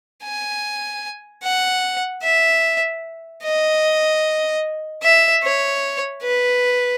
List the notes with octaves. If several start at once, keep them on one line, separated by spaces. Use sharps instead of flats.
G#5
F#5
E5
D#5
E5
C#5
B4